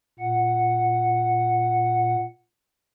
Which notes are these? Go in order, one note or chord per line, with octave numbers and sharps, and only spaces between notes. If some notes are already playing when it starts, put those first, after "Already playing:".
A#2 F#5